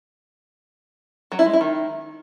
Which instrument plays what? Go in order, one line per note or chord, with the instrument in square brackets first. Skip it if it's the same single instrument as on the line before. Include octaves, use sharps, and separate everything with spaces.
[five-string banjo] F#3
E4
G#3
E4
D#3